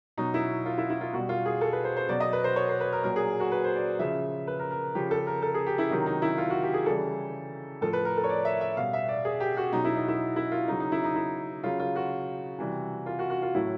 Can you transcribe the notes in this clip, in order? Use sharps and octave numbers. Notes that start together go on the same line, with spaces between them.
B2 F#3 D#4
E4
F4
E4
E4
F4
B2 G3 F#4
F4
G#4
A4
B4
C5
C5
B2 F#3 D5
D#5
B4
C5
C#5
C5
B4
A#4
A#2 F#3 A#4
G#4
F#4
B4
C5
D5
C#3 F3 E5
B4
A#4
A#4
C#3 F3 G4
A4
A#4
A4
G#4
G4
E4
C3 D#3 F#3 D#4
D#4
E4
F4
F#4
G4
G#4
C#3 E3 G3 A4
A2 F3 A4
B4
A#4
A4
C#5
D5
E5
E5
B2 G3 F5
E5
D5
G#4
G4
F#4
B2 F#3 D#4
E4
D#4
E4
E4
F4
C#3 F#3 D#4
D#4
E4
D#4
E4
C#3 F#3 F4
F4
F#4
C3 E3 G3
F4
F#4
F#4
F4
A2 F#3 E4